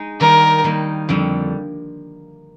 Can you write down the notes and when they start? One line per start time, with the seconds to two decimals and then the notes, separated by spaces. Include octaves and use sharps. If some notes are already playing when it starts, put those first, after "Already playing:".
Already playing: G#3 D#4
0.20 D#3 G3 A#3 A#4
0.64 D#3 G3 A#3
1.09 F2 D3 G3